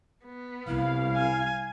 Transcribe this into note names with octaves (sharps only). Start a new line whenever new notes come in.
B3
C2 E4 F5
G#5